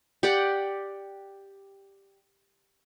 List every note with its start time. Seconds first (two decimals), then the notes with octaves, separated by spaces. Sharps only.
0.23 G4 D5 F#5